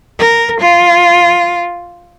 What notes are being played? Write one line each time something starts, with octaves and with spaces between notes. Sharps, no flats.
A#4
F4